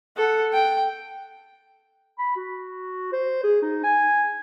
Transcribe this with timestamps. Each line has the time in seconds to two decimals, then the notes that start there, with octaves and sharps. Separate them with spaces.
0.16 A4 F#5
0.53 G5
2.19 B5
2.36 F#4
3.12 C5
3.44 G#4
3.62 D#4
3.83 G#5